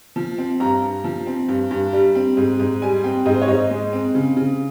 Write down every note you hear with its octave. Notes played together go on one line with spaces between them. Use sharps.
F3
C4
G2 A#5
G2
F3
C4
G2
G2
G3
C4
G#2
G#2
G3 G#5
C4 G5
G#2 D#5
C5
C#5
G#2 D#5
G#3
C4
C#3
C#3